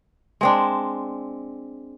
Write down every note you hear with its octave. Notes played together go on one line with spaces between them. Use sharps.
G#3 C4 D4